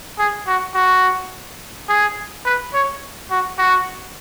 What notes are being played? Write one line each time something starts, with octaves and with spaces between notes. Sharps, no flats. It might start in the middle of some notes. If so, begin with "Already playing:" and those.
G#4
F#4
F#4
G#4
B4
C#5
F#4
F#4